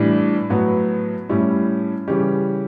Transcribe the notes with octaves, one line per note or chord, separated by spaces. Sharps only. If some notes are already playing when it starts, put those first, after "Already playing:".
Already playing: A2 E3 G3 D4
A2 F#3 B3 F#4
A2 G3 C#4 E4
C#3 E3 G3 C#4 G4